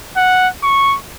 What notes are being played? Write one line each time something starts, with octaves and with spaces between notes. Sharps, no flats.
F#5
C#6